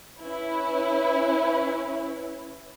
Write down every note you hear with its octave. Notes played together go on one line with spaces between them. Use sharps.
C#4 E4 B4